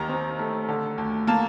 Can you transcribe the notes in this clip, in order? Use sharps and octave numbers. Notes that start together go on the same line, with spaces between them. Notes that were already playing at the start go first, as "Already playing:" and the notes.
Already playing: D#2 D#3 A#5
C4
A3
D3
D2
A#3 A5